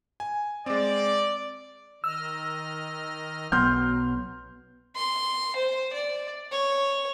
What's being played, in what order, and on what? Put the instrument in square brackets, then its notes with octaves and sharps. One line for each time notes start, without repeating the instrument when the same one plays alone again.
[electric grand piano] G#5
[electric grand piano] G#3 C4 [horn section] D5
[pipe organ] D#3 D#5 F6 [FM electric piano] E6
[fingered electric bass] B1 B3 [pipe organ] F#3 [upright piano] C6 F6 G6
[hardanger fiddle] C6
C5
D5
C#5